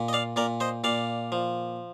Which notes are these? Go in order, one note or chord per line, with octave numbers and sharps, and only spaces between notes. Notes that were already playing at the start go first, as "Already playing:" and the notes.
Already playing: A#2
D#5
D5 F5
A#2 A#4 D5
C5 D#5
A#2 D5 F5
F3